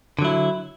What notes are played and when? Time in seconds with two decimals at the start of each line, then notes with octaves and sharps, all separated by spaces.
0.19 D3
0.22 F#3
0.25 E4